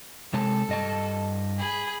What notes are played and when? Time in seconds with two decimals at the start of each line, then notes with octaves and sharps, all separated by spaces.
0.33 C3 G#3 A4 A5
0.69 G2 D#5 A5
1.59 G#4 B5